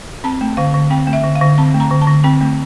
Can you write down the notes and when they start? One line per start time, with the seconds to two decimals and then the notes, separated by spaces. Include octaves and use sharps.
0.24 C4 A5
0.41 A3
0.57 D3 F5
0.74 D3
0.90 C4 G5
1.07 A3
1.13 E5
1.24 D3
1.35 F5
1.41 D3
1.58 C4 A5
1.74 A3
1.80 A#5
1.91 D3
2.01 A5
2.07 D3
2.24 C4 G5
2.41 A3